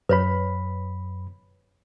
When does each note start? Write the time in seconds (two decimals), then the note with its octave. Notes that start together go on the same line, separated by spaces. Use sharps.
0.09 F#2 B4 C#5 B5